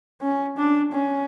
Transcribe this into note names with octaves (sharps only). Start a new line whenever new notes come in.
C#4
D4
C#4